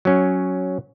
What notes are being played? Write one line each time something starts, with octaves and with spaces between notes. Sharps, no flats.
F#3 C#4